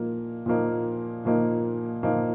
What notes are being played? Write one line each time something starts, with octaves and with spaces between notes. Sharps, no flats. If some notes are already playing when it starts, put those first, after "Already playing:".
Already playing: A#2 F3 A#3 D#4
A#2 F3 A#3 D#4
A#2 F3 A#3 D#4
A#2 F3 A#3 D#4